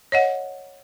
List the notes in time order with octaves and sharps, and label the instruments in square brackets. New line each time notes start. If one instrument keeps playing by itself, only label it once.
[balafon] C#5 D#5 F#5